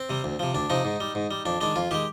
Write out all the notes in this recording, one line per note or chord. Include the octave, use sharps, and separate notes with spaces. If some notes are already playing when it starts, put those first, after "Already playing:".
Already playing: C4
C3 G3
D2
C3 F3
D2 D4
C3 F3 D#4
G#2
G3
G#2
G3
F2 D4
D#3 G#3 D4
F2 F4
D#3 G#3 G4